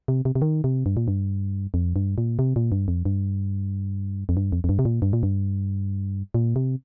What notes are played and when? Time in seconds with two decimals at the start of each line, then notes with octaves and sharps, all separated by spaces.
0.08 C3
0.25 C3
0.35 C3
0.42 D#3
0.64 C3
0.86 G2
0.97 A#2
1.08 G2
1.74 F2
1.96 G2
2.18 A#2
2.39 C3
2.56 A#2
2.72 G2
2.88 F2
3.05 G2
4.29 F2
4.37 G2
4.52 F2
4.64 F2
4.69 G2
4.79 C3
4.85 A#2
5.02 G2
5.13 A#2
5.23 G2
6.34 A#2
6.56 C3